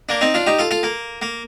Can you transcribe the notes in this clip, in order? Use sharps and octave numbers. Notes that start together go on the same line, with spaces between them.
A#3 D4
C4 D#4
D4 F4
D#4 G4
F4 A4
F4 A4
A#3
A#3